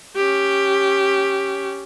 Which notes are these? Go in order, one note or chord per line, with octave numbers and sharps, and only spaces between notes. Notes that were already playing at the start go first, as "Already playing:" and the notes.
C#4 G4